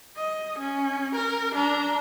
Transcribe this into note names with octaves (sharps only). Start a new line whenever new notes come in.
D#5
C#4
A#4
D4 A#5